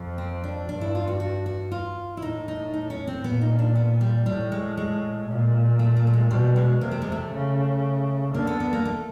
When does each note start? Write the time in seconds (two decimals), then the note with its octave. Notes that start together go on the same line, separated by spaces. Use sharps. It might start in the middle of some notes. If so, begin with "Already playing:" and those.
Already playing: F2
0.18 C4
0.44 D4
0.69 G2 D4
0.81 E4
0.95 F4
1.07 F#4
1.20 F#4
1.46 F#4
1.71 F4
2.17 E4
2.22 A2 D#4
2.48 D#4
2.74 D#4
2.90 C#4
3.07 C4
3.24 A#2 B3
3.41 D#4
3.59 D4
3.75 B3
4.01 G3
4.26 A2 G3
4.52 G#3
4.77 G#3
5.28 A#2
5.79 A3
5.97 A3
6.07 A3
6.13 G#3
6.31 B2 G3
6.56 G#3
6.81 C3 A#3
6.91 A3
7.02 G#3
7.12 A3
7.32 C#3
8.34 D3 A#3
8.47 B3
8.60 B3
8.73 A#3
8.85 A3